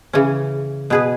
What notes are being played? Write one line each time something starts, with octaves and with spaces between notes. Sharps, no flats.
C#3 E3 C#4
B2 B3 G#4 B4